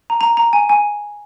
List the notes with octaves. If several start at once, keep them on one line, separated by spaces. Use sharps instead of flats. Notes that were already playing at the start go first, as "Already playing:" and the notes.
A#5
A#5
A#5
G#5
G#5